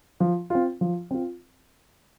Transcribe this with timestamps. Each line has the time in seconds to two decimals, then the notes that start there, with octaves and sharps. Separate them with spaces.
0.20 F3
0.50 C4 F4
0.81 F3
1.11 C4 F4